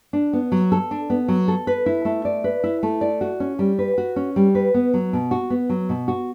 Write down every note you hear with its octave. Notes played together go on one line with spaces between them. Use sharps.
D4
B3
F#3
A4
D4
B3
F#3
A4
B4
E4
A3
D5
B4
E4
A3
D5
F#4
C#4
G3
B4
F#4
C#4
G3
B4
B3
F#3
B2
F#4
B3
F#3
B2
F#4